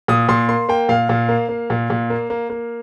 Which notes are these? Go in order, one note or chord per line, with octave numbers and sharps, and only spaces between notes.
A#2 D#6
A#2 C6
A#3 C6
A#3 G5
A#2 F5
A#2
A#3
A#3
A#2
A#2
A#3
A#3
A#3